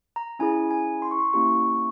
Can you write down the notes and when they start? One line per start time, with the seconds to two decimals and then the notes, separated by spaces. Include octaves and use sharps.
0.16 A#5
0.39 C#4 E4 G#4 G#5
0.71 G#5
1.02 C6
1.11 C#6
1.19 C6
1.33 A#3 C#4 E4 G4 C#6